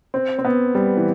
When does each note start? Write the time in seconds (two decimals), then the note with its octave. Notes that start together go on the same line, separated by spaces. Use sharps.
0.14 C4
0.39 C4
0.45 B3
0.75 G3
0.97 E3